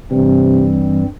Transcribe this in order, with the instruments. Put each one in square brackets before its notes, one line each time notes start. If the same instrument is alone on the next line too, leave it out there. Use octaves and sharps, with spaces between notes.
[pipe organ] G2 E3 G3 C4 [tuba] C3